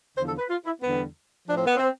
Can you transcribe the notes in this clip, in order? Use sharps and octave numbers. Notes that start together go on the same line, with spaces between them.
E2 D3 F3 C5
A4
B4
F4
E4
E2 D3 G3 B3
A2 F3 D4
C4
B3
C4